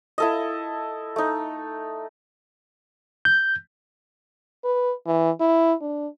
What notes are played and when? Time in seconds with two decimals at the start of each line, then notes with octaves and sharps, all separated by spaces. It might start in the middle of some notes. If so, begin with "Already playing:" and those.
0.18 E4 A4 D#5
1.16 A3 D#4
3.25 G6
4.65 B4
5.07 E3
5.40 E4
5.82 D4